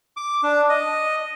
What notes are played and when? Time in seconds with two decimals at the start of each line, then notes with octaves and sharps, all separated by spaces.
0.17 D6
0.43 D4
0.69 D#5